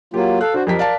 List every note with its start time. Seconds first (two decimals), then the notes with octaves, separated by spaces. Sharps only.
0.14 F#3 A#3 F4 G4
0.41 A4 F5 F#6
0.54 D4 F#4 C5
0.67 F2 G4 A#4 B6
0.79 D5 F5 A5